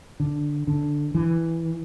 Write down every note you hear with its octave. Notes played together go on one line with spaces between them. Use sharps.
D3
D3
E3